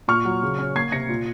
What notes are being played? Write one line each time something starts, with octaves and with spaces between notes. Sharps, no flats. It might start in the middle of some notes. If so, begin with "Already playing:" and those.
A#2 C#6 F6
F#3
C#3
C#4
A#3 G#6 C7
C3 A#6 C#7
A#2